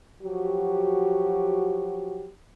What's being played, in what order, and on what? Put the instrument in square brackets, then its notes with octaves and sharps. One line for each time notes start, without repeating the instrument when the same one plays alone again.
[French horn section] F3 F#3 F#4 G4